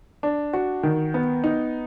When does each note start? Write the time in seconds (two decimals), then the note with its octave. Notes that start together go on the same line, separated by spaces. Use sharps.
0.23 D4
0.53 F#4
0.83 D#3
1.14 B3
1.44 D#4